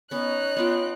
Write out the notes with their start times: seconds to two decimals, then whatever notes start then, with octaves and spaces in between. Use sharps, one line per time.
0.11 B3 C#4 D#4 C#5 F#6
0.57 B3 F4 G5